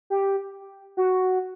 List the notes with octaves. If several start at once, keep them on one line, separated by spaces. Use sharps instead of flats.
G4
F#4